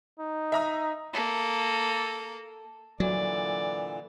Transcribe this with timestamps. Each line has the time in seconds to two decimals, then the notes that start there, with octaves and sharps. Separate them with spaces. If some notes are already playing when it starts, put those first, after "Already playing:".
0.20 D#4
0.52 E5 A#5 D#6
1.13 A#3 A4
3.00 A#2 D3 E3 F#3 D5